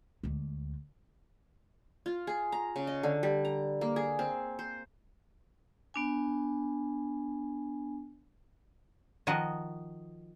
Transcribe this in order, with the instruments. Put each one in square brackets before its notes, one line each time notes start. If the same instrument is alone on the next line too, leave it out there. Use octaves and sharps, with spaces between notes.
[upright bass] D2 G#3
[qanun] F4
G#4
A#5
C#3
D#5
D3
G3
A#5
A#3
G#4
C4
C5
[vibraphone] B3 D4 G#5
[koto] D#3 F3 F#4 D#5